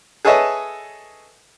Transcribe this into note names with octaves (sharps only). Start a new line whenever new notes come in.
G#4 A4 B4 C#5 D#5 E5